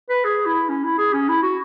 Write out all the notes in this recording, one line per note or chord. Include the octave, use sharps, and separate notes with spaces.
B4
G#4
E4
C#4
E4
G#4
C#4
E4
F#4